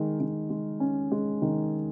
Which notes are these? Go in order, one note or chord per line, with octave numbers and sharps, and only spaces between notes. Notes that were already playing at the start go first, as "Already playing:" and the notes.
Already playing: D#3 G#3
D#3
G#3
C#4
G#3
D#3